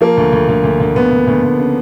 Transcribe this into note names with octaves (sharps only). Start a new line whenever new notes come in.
F3 A#3
D2
D2
D2
D2
D2
D2 B3
D2
D2
D2
C#3